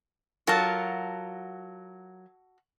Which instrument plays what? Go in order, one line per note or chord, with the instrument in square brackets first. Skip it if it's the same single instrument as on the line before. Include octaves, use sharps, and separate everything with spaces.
[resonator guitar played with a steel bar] F#3 F4 A#4 [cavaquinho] F#4 A4 A5